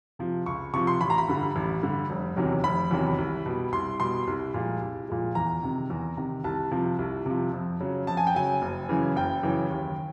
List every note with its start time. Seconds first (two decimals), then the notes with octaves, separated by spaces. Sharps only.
0.19 C3 F3
0.46 C#2 C#6
0.74 C3 F3 C#6
0.87 C6
1.01 A1 B5
1.10 A#5
1.18 B5
1.28 G2 D3 G3
1.56 A1
1.82 G2 D3 G3
2.10 F1
2.36 E2 C3 D#3 F#3
2.64 F1 B5
2.91 E2 C3 D#3 F#3
3.18 C2
3.46 B2 G3
3.72 C2 C6
4.00 B2 G3 C6
4.27 C2
4.54 A#2 F3 G#3
4.81 C2
5.09 A#2 F3 G#3
5.35 E2 A#5
5.63 C3 D#3
5.90 E2
6.17 C3 D#3
6.44 C2 A5
6.71 C3 F3
6.99 C2
7.26 C3 F3
7.53 F2
7.80 C#3 F#3
8.07 F2 A5
8.17 G#5
8.27 G5
8.35 C#3 F#3 G#5
8.62 F#1
8.89 F#2 C#3 E3
9.16 F#1 G5
9.43 F#2 C#3 E3
9.70 D#2